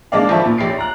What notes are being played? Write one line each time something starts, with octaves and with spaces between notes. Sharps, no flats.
G#3 A#3 D4 D#4 D5 F5
G#1 F3 E5 A5 C#6
A#2
A#1 G4 C#5 C7 D7
A#5 F#6